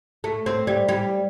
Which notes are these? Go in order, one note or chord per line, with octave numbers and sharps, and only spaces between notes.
A3
C4
G3
G3